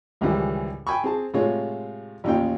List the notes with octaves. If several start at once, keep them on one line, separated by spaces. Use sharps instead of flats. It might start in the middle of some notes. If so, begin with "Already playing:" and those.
C#2 G#2 D#3 E3 G3
G5 G#5 B5 C#6
C4 G#4 A5
A2 C3 G#3 F4 C#5
A1 D#2 C#4 D#4 F4 G5